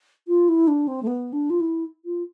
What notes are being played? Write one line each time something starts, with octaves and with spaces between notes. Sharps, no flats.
F4
E4
D4
C4
A3
B3
D4
F4
E4
F4